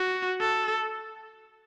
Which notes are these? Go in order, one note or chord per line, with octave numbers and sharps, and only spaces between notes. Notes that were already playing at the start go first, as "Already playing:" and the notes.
Already playing: F#4
A4